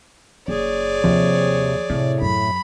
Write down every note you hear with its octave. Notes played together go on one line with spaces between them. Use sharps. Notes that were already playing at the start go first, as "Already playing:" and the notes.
F#1 G#4 C#5 D5
D#2 C3 F3
A2 C3
F#2 B5